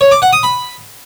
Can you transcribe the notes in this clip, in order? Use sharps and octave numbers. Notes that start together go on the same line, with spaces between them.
C#5
D6
F#5
D#6
B5